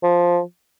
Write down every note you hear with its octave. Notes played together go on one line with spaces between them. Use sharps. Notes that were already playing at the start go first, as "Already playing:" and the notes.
F3